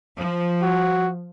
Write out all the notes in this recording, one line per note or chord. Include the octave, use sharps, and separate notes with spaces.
F3
F#4